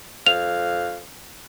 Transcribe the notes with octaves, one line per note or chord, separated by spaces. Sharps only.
F2 F5 F7